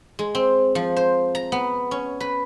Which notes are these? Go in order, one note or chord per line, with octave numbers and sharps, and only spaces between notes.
G#3
C4
F3
C5
A#5
B3
C#4
B4